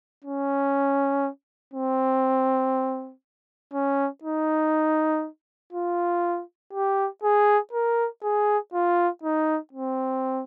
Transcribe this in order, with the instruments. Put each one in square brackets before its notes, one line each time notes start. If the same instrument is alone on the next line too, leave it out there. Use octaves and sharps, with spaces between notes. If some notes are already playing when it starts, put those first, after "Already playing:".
[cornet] C#4
C4
C#4
D#4
F4
G4
G#4
A#4
G#4
F4
D#4
C4